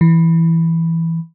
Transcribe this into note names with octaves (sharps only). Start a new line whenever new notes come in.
E3